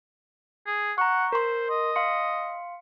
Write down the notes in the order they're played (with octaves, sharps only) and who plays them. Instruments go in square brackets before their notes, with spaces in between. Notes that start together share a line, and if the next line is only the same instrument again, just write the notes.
[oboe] G#4
[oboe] F#5 [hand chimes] A#5 C#6
[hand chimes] A#4 C6 [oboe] C5
[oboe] D#5
[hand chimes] F5 C6 C#7